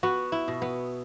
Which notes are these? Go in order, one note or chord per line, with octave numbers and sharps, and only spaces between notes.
B3 F#4
E4
B2
B3